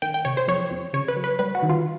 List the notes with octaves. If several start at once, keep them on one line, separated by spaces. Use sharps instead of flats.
D#3 G5
G5
C3 C#5
C5
F2 C#5
F2
C#3 C#5
B4
F#3
B4
G3 B4
F#4
D#3
F4